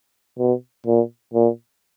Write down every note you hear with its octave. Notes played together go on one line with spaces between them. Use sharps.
B2
A#2
A#2